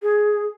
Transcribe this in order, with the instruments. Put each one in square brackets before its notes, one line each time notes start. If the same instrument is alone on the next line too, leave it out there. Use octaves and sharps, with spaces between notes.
[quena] G#4